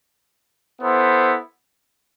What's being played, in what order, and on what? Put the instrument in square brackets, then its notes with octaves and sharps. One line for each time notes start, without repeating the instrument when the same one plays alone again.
[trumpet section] B3 E4 A4 C5